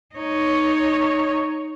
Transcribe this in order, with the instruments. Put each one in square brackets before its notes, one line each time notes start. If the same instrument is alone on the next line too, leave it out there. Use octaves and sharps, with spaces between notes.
[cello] D#4 C#5